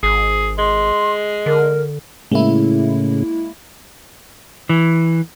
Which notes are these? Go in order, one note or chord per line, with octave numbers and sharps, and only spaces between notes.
G#1 G#4
G#3 C6
D3 A#4
A2 C#3 G#3 A#3 E4
E3